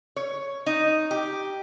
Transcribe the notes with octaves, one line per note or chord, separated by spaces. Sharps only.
C#5
D#4
G4